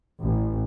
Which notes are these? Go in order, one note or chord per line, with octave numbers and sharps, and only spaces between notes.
A1